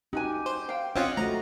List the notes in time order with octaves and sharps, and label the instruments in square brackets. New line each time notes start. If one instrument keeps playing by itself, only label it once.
[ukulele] D#4 F#4 G#5 [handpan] G4
[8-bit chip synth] C5
[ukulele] F5 G5
[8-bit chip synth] C4 C#4 F4 [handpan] D#5 F#5
[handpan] A3 F#4 [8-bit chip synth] A#5